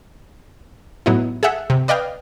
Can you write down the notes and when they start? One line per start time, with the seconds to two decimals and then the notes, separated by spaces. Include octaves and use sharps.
1.06 A2 F#3 B3 D#4 E4
1.43 G#4 A4 E5 F#5
1.70 C3
1.88 B4 D5 D#5 F5 G5